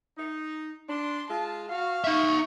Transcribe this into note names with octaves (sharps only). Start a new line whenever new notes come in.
D#4
D4 C6
G#3 F4 A5
F#4 F5
D#4 E5 C#6